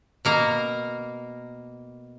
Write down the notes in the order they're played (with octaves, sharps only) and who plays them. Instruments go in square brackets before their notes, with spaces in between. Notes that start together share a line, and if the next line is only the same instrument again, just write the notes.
[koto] B2 A#3 A#4